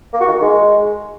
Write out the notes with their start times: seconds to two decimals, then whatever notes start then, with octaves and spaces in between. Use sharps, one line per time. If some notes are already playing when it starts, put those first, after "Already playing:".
0.13 A#3
0.21 F#4
0.28 D#3
0.35 D#4
0.42 G#3